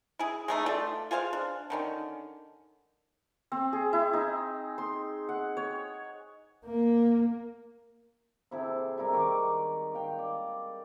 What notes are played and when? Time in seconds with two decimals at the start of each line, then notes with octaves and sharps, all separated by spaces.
0.19 E4 G#4
0.48 G#3 A3 D#4
0.66 A3 F4 A4 D5
1.11 F4 G#4 C5 F5
1.33 D4
1.70 D3 D#3 C#4
3.52 C4
3.73 G#4
3.93 E4
4.13 D#4
4.78 C6
5.29 F#5
5.57 C#5
6.66 A#3
8.51 C3 E4 G#4 A4
8.97 G3 G#3 E4 A#4
9.13 D#3 C#6 D6
9.94 F5 G5
10.18 D5